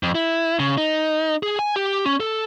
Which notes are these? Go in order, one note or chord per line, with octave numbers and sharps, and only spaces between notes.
F2
E4
C#3
D#4
G#4
G#5
G4
C#4
A4